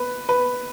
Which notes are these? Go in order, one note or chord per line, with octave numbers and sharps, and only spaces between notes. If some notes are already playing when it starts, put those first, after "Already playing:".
Already playing: B4
B4